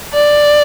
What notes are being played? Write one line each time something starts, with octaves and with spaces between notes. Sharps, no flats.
D5